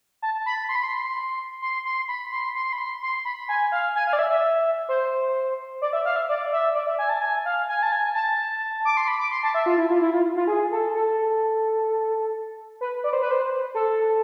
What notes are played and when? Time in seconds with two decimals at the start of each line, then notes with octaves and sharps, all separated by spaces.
0.22 A5
0.46 B5
0.69 C6
0.76 B5
0.83 C6
1.62 C6
1.85 C6
2.08 B5
2.32 C6
2.55 C6
2.73 B5
2.78 C6
3.03 C6
3.25 B5
3.49 G#5
3.72 F5
3.95 G#5
4.07 F5
4.13 D5
4.19 E5
4.30 E5
4.89 C5
5.82 D5
5.93 E5
6.05 F5
6.16 E5
6.29 D5
6.52 E5
6.75 D5
6.87 E5
6.99 G#5
7.09 A5
7.21 G#5
7.45 F5
7.68 G#5
7.83 A5
7.92 G#5
8.15 A5
8.85 D6
8.97 C6
9.08 B5
9.20 D6
9.31 C6
9.43 A5
9.54 E5
9.66 F4
9.78 E4
9.90 F4
10.02 E4
10.13 F4
10.36 F4
10.47 G#4
10.72 A4
10.95 A4
12.81 B4
13.04 D5
13.13 C5
13.22 B4
13.31 C5
13.75 A4